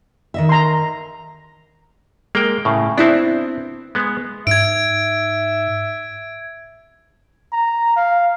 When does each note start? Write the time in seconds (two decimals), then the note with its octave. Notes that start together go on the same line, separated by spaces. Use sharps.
0.34 D#3 D#5 E5
0.49 A#5 C6
2.35 G#3 A#3 G5
2.65 A2 C#3
2.98 B3 C4 D4 E4
3.95 G#3 B3
4.47 G#2 E5 G#6 D7
7.53 A#5
7.97 F5